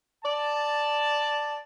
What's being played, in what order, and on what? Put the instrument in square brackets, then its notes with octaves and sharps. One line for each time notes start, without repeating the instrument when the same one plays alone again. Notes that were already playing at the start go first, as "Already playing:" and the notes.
[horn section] D5 A5